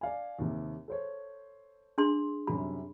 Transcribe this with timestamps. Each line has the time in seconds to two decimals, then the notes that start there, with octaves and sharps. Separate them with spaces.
0.01 D5 F5 G#5
0.39 D#2 C3
0.88 A4 C5 C#5
1.98 D4 G#4 C6
2.47 F#2 C3 G3 B5